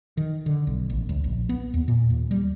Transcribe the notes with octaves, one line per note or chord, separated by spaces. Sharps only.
D#3
D3
B1
A1
C#2
A#1
B3
D#2
A#2
D#2
G3